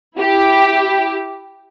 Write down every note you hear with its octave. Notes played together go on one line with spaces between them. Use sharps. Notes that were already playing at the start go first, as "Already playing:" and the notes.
E4 G4